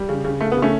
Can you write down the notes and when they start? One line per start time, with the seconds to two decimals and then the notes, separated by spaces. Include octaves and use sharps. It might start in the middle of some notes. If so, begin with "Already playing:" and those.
Already playing: G3
0.09 C#3
0.24 C#3
0.40 C#3 A3
0.52 B3
0.57 C#3
0.62 A3 C#4